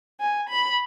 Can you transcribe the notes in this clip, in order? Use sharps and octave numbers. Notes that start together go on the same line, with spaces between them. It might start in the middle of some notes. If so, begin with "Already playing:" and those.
G#5
B5